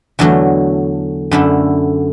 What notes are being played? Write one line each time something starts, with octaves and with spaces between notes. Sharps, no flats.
E2 D3 F#3 A3
F#2 D3 A3 E4